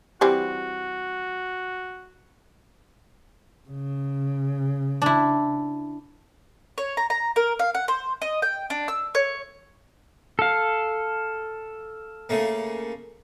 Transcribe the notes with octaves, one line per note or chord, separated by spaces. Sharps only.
E3 G3 C4 F#4 G4
C#3
D4 E4
C#5
A#5
A#5
A#4
F5
F#5
C5
D#5
G5
D4
E6
C#5
A4 F5
C#3 A3 A#3